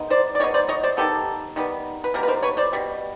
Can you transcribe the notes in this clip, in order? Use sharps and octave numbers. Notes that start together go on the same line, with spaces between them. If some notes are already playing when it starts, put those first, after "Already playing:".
Already playing: D#3 G#3 B3
C5 D5
D5
D#3 G#3 B3 C#5
C5 D5
C#5 D#5
C5 D5
D#3 G3 B3 G4 A4
D#3 G3 B3
B4
B2 G3 A#3 A#4
B4
A#4 C5
B4 C#5
C5 D5
B2 G3